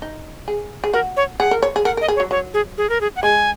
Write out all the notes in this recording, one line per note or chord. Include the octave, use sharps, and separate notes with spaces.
D#4
G#4
G#4
F#4 A#4
C#5
G#4 F#5
A#4
C#5
G#4
A#4 F#5
A#4 D#5
G#4
C#5
F#3
F#3 C#5
G#4
G#4
A#4
G#4
F#5
G#3 G#5